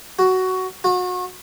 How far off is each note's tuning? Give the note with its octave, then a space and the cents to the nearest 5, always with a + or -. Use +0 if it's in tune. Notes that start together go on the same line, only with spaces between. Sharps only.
F#4 +10
F#4 -35